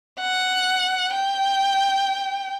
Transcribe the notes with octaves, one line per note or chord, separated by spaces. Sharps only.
F#5
G5